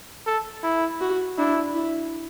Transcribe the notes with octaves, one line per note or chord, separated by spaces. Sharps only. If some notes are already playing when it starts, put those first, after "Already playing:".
A4
E4
F#4
D4 E4
E4